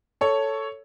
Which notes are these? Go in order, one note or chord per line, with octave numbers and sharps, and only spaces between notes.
A4 C#5